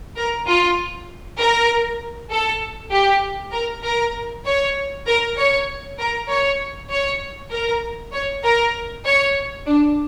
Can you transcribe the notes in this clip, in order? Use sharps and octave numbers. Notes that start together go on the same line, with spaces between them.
A#4
F4
A#4
A4
G4
A#4
A#4
C#5
A#4
C#5
A#4
C#5
C#5
A#4
C#5
A#4
C#5
D4